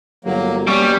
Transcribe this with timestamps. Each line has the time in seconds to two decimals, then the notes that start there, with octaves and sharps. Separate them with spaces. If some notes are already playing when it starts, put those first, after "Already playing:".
0.25 G1 F#3 A#3
0.67 B2 G3 A#3 C#4 C#5